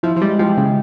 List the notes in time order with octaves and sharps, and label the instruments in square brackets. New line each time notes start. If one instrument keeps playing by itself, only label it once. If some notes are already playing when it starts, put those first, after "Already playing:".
[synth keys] F3 [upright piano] E4
[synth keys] F3
[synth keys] G3 [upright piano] G#3
[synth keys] F3 [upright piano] G4
[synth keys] C#3 [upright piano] G#3